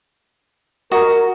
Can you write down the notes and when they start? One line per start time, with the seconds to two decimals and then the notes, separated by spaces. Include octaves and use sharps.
0.92 F#4 A#4 D#5